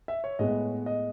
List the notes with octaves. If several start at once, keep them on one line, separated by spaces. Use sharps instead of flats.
E5
C#5
A2 G#3 B3 D#5
D#5